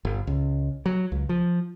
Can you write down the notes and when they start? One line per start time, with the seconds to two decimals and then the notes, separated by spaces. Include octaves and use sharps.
0.05 G1
0.27 C#2
0.86 F#3
1.12 C#2
1.29 F3